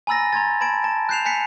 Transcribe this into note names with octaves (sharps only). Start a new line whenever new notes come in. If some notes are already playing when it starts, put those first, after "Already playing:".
G#5 A#5 B5 E6 A6 A#6
A#5 C6 G#6 A6
A5 B5 G#6 D7
A5
F#6 G6 C7 E7 F7
G#5 F#6 B6 C#7 F7